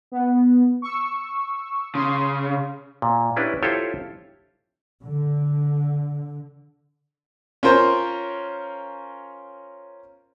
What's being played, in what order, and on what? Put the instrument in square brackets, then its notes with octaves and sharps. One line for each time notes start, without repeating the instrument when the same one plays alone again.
[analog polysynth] B3
C#6 E6
[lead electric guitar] C#3 [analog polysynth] C6
[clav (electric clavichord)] A#2
C#4 D4 E4 G4 B4
E4 F4 G4 A4 C5 C#5
[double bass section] D3
[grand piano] C#4 F4 A#4 C5